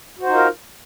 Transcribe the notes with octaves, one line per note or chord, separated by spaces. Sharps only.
D#4 F4 F#4 A#4 C5